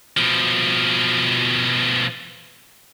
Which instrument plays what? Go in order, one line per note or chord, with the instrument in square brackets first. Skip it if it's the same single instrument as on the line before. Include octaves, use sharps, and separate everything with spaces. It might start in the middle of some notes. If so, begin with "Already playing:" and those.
[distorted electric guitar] B2 F3